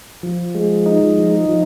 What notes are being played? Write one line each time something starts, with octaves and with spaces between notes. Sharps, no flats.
F3
G#3
D#4
F3
F3